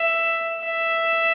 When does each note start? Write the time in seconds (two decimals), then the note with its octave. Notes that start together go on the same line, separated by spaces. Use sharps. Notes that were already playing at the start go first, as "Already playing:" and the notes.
Already playing: E5
0.63 E5